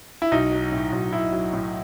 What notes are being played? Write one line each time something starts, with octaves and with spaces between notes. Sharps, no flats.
E4
B1 D#4
F#3
A2
B1
B1 E4
F#3
A2